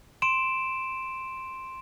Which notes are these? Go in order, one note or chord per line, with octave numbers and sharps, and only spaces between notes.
C6 D7 E7